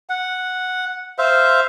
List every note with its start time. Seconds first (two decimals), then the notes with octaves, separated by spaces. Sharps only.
0.09 F#5
1.18 C5 E5 F5